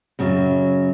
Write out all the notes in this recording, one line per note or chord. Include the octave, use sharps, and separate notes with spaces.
F#2 C#3 F#3